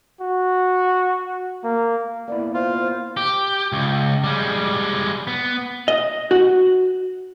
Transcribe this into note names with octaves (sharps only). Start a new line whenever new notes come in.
F#4
A#3
A#3 B3 E4 D5
F4 C5
C5
G4
C#2
G3 G#3
B3
D#5
F#4